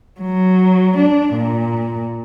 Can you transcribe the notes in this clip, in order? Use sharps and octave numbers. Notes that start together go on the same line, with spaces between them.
F#3
D4
A#2